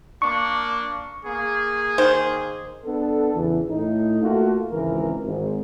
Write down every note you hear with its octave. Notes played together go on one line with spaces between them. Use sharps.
A#3 D4 C#6
A#3 G#4
D#3 C5
B3 D4 A4
E2 C#3 E3
A2 D#4
A3 A#3 F4 F#4 A4
G#1 C#2 E3 A#4
G#1 G#2